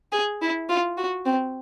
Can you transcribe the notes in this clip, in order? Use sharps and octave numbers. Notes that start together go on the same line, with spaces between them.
G#4
E4
F4
F#4
C4